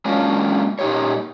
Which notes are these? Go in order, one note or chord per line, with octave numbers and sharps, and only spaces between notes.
G#3 A#3 C#4 D4 F4 F#4
A#2 D#4 G4 C5 C#5